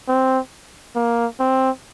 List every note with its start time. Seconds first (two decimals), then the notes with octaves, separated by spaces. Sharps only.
0.08 C4
0.96 A#3
1.40 C4